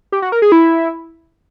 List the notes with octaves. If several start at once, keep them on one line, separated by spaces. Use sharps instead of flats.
G4
F#4
A#4
G#4
E4